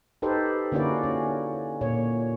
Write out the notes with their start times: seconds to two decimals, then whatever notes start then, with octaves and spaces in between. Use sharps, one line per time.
0.22 D#4 G4 A4 B4 C5
0.72 D3 A#3 C#4 E4 F#4 D5
1.04 C#4
1.81 A#2 C#5